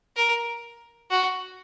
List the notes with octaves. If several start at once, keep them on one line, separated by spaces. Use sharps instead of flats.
A#4
F#4